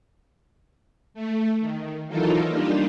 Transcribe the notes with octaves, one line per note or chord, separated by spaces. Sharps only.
A3
D#3
E3 F#3 D#4 F4 A4 A#4
G3 A#3 D4 D#4 F4 G4